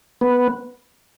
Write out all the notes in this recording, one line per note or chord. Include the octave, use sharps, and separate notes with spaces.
B3